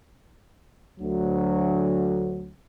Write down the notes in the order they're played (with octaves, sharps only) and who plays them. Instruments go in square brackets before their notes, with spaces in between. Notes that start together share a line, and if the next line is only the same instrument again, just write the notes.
[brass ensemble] D2 F#3